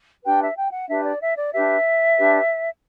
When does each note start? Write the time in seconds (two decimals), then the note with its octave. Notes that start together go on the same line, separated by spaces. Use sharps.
0.24 D4 G4 B4 G5
0.41 E5
0.56 G5
0.73 F#5
0.88 D4 G4 B4 E5
1.04 D5
1.21 E5
1.36 D5
1.53 D4 G4 B4 E5
2.17 D4 G4 B4